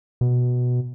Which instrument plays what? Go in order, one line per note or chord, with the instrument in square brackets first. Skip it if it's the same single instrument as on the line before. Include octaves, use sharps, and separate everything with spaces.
[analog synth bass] B2